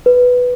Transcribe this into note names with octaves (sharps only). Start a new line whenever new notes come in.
B4